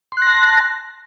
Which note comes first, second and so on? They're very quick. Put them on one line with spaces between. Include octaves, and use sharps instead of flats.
C6 F#6 A#6 A5